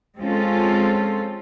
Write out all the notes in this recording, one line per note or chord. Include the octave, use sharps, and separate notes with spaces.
G#3 C4 C#4 F4 A4